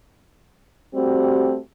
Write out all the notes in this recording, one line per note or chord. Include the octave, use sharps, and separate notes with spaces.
G3 A3 C4 F#4 G4